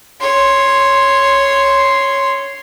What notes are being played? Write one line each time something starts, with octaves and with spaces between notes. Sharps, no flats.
C#5 C6